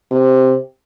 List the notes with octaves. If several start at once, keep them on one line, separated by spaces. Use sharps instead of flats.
C3